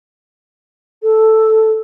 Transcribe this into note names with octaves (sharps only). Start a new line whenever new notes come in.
A4